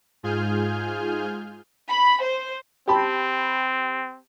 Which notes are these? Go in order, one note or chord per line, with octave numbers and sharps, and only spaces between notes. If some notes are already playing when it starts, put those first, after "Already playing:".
G#2 F4 G#4 G#5 F6 G6
B5
C5
C4 G4 A5 B5